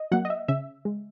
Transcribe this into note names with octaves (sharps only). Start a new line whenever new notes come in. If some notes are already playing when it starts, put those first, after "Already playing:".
Already playing: D#5
F#3 A#3 F#5
D#5
E5
C#3 E5
G#3